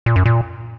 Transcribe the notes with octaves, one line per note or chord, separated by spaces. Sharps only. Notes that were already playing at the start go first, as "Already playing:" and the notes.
A#2
F#2
A#2